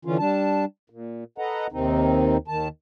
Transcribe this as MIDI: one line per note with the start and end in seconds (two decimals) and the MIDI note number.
0.05 0.17 50
0.05 0.17 52
0.05 0.17 61
0.05 0.17 65
0.19 0.65 55
0.19 0.65 62
0.19 0.65 81
0.90 1.24 46
1.38 1.67 69
1.38 1.67 71
1.38 1.67 75
1.38 1.67 78
1.38 1.67 82
1.72 2.37 39
1.72 2.37 48
1.72 2.37 51
1.72 2.37 60
1.72 2.37 63
2.48 2.68 39
2.48 2.68 51
2.48 2.68 81